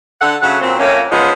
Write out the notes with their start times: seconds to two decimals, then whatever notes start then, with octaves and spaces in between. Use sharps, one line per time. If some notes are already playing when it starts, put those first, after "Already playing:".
0.21 D3 A4 F#5
0.42 C#3 F#3 A3 F#5
0.62 A#2 F#3 C4
0.79 F2 A3 A#3 C#4
1.12 F3 G#3 B3 C#4 D#4